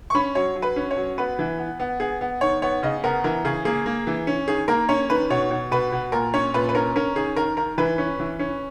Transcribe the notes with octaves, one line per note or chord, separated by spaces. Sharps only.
C#6
C#4 B5
F#3 C#5
F#3
B4
C#4
C#5
F#3
B3 B4
E3
B3
B3
B3 G#4
B3
D#3 C#5
B3 C#5
C#3 D#5
B3 A#4
E3 A#4
C#3 G#4
A#3 G#4
A#3
E3
C#4
D#3 G#4
A#3 A#4
C#4 C#5
D#3 B4
B2 C#5
B2
B2 B4
B2
A#2 A#4
C#4 C#5
A#2 B4
B4
C#4 A#4
C#4 A#4
D#3 G#4
D#3 A#4
D#3 A#4
E3 B4
C#4
E3
C#4